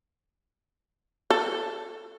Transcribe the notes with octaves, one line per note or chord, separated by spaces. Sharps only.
A4